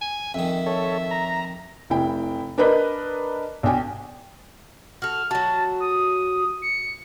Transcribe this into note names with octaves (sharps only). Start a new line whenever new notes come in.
G#5
F2 D#3 E5
A4 C#5
A#5
F1 E4 G5
D4 A#4 B4 D#5
B1 D4 G5 G#5
F#4 A4 F6
F#3 F#4 A5
D#6
C#7